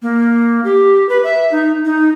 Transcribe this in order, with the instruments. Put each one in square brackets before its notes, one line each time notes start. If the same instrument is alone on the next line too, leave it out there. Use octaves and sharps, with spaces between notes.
[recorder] A#3
G4
B4
E5
D#4
D#4